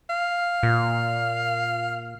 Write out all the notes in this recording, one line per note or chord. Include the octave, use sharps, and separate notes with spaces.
F5
A#2